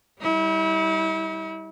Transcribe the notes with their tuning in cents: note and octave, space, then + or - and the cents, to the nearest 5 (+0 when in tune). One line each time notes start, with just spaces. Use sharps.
G3 +0 E4 -35